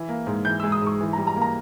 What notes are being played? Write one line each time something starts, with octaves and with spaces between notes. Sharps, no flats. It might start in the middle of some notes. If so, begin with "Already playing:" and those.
Already playing: E3
A#3
G#2
E3 G6
G#3 E6
D#6
G#2 C#6
E3
G3 A#5
A#5
A#3
A#5